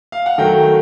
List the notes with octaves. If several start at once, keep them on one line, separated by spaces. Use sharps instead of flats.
F5
F#5
D#3 F#3 A3 G5